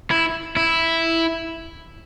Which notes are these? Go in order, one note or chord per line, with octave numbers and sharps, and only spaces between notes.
E4
E4